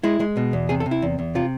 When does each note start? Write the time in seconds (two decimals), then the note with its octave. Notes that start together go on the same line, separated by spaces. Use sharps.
0.04 G#3 E4
0.20 G#3
0.37 B2
0.53 E2
0.69 C3 G#4
0.80 A4
0.86 C3
0.91 E4
1.02 E2
1.19 E2
1.35 C3 F4